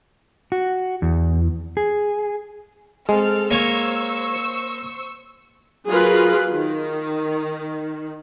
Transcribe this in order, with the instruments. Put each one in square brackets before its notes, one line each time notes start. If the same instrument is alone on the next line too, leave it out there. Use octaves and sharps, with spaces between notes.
[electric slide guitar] F#4
E2
G#4
[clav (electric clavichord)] G#3 [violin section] C4 A4 F6
[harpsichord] A#3 C#5 G#5 [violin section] C5 C#6 E6
[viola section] F#3 F4 G#4 A#4 B4
D#3